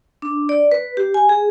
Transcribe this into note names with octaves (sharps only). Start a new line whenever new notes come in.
D4
D5
B4
G4
G#5
G#4